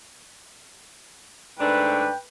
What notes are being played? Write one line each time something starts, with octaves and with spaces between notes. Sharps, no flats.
G#2 A3 D4 B4 G5